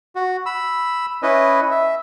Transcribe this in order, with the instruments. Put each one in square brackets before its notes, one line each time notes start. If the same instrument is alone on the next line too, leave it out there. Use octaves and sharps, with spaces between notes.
[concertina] F#4
B5 E6
C#4 E4 B4 D#5
E5